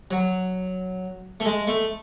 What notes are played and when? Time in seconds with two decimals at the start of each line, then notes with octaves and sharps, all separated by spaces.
0.11 F#3
1.40 A3
1.46 G#3
1.68 A3